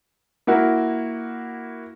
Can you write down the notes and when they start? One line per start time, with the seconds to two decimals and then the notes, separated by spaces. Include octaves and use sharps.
0.47 A#3 E4 F#4 A#4